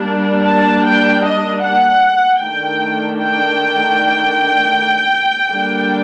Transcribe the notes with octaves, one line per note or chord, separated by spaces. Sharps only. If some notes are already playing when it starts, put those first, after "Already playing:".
Already playing: G3 A#3 D4
A5
G5
D#5
F#5
D#3 A3 D4 G5
G5
D3 G3 A#3 D4